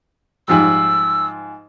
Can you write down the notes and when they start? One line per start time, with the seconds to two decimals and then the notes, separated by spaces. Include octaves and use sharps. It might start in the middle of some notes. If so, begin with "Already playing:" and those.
0.48 G#2 F3 G3 E6